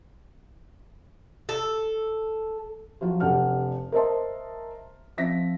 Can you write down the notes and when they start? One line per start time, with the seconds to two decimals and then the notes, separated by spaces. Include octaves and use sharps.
1.49 A4
3.01 F3 F#3 F4 F#4
3.20 F1 D4 G4 A4 F#5 F6
3.92 A#4 C5 D#5 E5 A5 C6
5.17 F3 C4 E5 A#6 B6